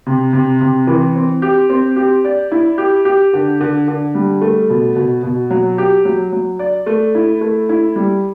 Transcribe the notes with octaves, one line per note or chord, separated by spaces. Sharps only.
C3
C3
C3
E3
C4
G4
C4
G4
D5
E4
G4
G4
D3
D3
D3
G3
A3
B2
B2
B2
F#3
G4
F#3
F#3
D5
A3
E4
A3
E4
G3